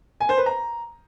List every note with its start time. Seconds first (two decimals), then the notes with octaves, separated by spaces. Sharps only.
0.20 G#5
0.29 C5
0.38 B4
0.46 A#5